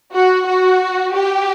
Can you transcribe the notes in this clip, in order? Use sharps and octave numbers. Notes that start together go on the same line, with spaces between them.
F#4
F#4
G4